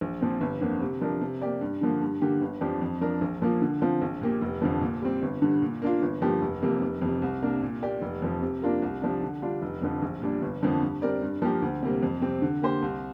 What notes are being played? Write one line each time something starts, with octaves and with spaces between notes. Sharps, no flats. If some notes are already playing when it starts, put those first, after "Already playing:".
A#1
A#2 F3 C4
G1
F2 D3 A#3
C3
F3 D4 A#4
C3
A#3 G4 D5
G2
D3 F3 A#3
G2
D3 A#3 G4
G1
F2 F3 D4 G4
F2
F3 D4 A#4
A#1
A#2 F3 A#3 F4
D3
F3 C4 F4
A#1
A#2 A#3 G4
F1
F2 D3 F3
A#2
G3 C4
G1
G2 D3
A#2
A#3 D4 F4
G1
G2 F3 A#3 G4
F1
F2 C3 A#3
F1
F2 C3
C2
C3 A#3 D4 A#4
A#2
A#3 G4 D5
F1
F2 F3
C3
A#3 D4 F4 A#4
C2
C3 F3 D4
D3
G3 D4 F4
F1
F2 D3 F3
A#1
A#2 G3 D4
G1
F2 D3 F3 A#3
G2
G3 C4 A#4 D5
G2
F3 A#3 G4 A#4
D2
C3 G3 A#3
F2
C3 G3 C4
D3
A#3 G4 C5
C2